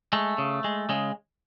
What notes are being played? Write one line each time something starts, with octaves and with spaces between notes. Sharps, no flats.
G#3 A3
C#3
G#3
C#3 G#3